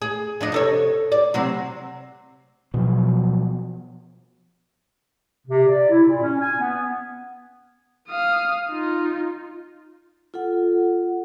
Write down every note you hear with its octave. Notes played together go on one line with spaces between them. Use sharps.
G#4
F3 D4 D#4
C3 A4 C#5
D5
C3 F#3 C4
B2 F3 F#3
C3
D5
E4
A#2
C#4
G#5
B3
F5 D#6
D#4 F4
F4 A4 F#5